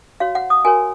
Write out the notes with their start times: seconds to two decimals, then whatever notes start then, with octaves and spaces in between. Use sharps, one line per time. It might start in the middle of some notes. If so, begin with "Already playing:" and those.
0.20 F#4 C#5 F5
0.35 F#5
0.50 D#6
0.65 F#4 A#4 C#5 G#5